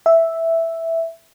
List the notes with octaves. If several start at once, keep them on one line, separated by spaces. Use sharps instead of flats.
E5